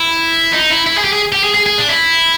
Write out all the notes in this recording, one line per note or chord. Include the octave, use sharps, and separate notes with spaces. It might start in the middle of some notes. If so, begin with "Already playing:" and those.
Already playing: E4
D#4
E4
E4
G#4
G4
G#4
G4
G#4
G#4
G#4
D4
E4